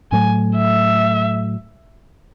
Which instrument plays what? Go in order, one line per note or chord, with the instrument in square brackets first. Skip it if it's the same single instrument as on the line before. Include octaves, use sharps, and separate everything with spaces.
[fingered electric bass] A2 F#3 A3 [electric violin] G#5
[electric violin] E5